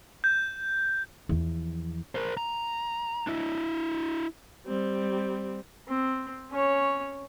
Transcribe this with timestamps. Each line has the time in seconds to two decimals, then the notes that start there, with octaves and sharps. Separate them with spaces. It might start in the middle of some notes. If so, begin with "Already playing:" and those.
0.24 G6
1.29 E2 F3
2.15 A#4 C5
2.37 A#5
3.27 D4 E4
4.67 G3 C4
5.88 C4
6.51 C#4 C#5